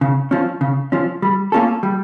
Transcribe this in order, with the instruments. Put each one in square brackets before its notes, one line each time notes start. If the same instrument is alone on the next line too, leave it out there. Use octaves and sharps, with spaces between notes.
[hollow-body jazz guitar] C#3
F3 C#4
C#3
F3 C#4
G3
A#3 C#4 F4 A4
G3